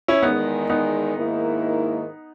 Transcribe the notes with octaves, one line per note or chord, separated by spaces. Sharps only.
C#4 E4
E2 D#3 G#3 B3 D#4
B3 D#4
G#2 D#3 A#3 E4